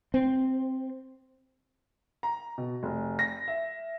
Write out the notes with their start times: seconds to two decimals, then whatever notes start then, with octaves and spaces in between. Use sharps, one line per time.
0.14 C4
2.23 A#5
2.58 B2
2.83 F1
3.19 A#6
3.48 E5